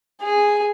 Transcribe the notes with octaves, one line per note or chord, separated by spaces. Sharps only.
G#4